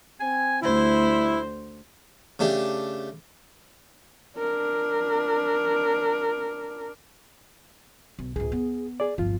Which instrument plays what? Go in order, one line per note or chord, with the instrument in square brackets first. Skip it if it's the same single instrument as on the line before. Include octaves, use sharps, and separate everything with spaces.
[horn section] C4 G#5
[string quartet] D2 C5 [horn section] G3 E4
[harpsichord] C#3 A3 D4 G4
[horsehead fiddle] D4 A#4
[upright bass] B1
[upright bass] C#2 A2 [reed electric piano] G#4
[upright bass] B3
[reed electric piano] G#4 D5
[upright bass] D1 G1 [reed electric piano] F3 F4